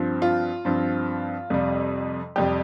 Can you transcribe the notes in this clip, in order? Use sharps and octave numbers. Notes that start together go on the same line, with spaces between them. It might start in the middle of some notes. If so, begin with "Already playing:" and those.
Already playing: G2 F3 C4
F4
G2 F3 C4
F2 C3 G3
F2 C3 G3 G4